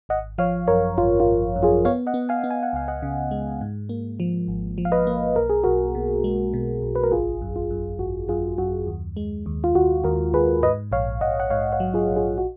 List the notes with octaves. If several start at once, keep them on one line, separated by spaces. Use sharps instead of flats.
G#1 D#5 F#5
F3 C#5 F5
F#2 A#4 C#5
G#1 F4
F4
G#1
F#2
F4 G#4
B3 C#5 F5
D#5 F#5
B3
F5 G#5
B3
G#5
F#5
C#2 F5
D#5 F#5
C#3
G#3
G#2
A#3
F3
G#1
F3
F5
B4 D#5
A#3
B1 A#4
G#4
B1 F#4 A#4
B2
G#3
B2
B1
B4
A#4
G#1 F4 G#4
F#2
F4
F#2
G#1 F#4
F#2 F4 G#4
F#2 F#4
D#2
G#3
D#2
F4
D#2 F#4
D#2 F#4 A#4
D#2 G#4 B4
G#2 B4 D#5
A#1 C#5 F5
A#1 D#5 F#5
F#5
G#2 C#5 F5
C#5 F5
F#3
F4 G#4
A#1
F4 G#4
F#4